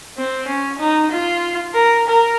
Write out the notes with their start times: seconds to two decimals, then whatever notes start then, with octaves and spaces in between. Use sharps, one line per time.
0.18 C4
0.48 C#4
0.79 D#4
1.12 F4
1.74 A#4
2.07 A#4